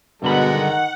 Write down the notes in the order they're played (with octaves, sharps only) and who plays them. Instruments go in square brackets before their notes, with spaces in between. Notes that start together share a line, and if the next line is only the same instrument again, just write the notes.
[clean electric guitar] G2 D3 B5 [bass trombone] B2 [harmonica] G#3 A#4 [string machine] F#5
[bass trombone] D#3